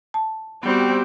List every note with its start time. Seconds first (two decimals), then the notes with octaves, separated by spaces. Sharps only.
0.14 A5
0.63 G3 B3 C4 F#4 G4